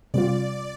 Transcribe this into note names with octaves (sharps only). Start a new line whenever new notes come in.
C3 G3 F4 D5